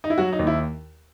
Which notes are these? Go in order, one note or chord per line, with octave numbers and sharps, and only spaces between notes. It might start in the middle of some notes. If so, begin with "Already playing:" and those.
D#4
E4
F#3 F#4
D#4
D#2
E4